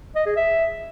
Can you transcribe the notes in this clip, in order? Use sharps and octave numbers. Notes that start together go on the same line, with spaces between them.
D#5
G#4
E5